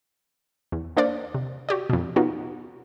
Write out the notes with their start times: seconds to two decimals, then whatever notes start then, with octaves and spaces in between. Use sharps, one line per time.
0.72 E2
0.97 A#3 D4 C5 D5 F5
1.34 C3
1.69 F#4 G4 D5
1.90 F2 B2
2.16 B3 C#4 D#4 F4 F#4